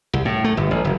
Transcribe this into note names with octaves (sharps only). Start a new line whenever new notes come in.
C2
A2
A3
G1
A1
F#1